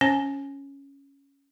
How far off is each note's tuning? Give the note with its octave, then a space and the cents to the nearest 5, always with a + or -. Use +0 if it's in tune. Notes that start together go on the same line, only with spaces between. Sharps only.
C#4 +0 C#5 -45 G#5 +10